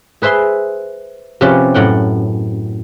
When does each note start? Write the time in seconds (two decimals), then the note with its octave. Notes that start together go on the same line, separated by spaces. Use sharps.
0.22 G#4 B4 C5 E5 C6
1.41 C3 F3 C#4 G4 B4
1.74 F#2 A2 F#5 G5